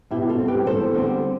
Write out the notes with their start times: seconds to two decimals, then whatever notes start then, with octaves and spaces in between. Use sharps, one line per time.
0.11 B2 E4 G4
0.29 F4 A4
0.39 G3 C4
0.48 G4 B4
0.66 E2 A4 C5
0.95 D3 G3 C4